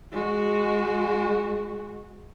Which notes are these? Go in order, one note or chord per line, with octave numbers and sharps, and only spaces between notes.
G#3 F#4